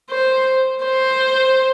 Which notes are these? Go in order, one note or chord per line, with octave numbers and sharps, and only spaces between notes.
C5
C5